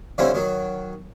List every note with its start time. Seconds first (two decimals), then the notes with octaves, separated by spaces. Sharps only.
0.18 D3 F3 G3 C4 C#4 E4
0.34 D#3 F#3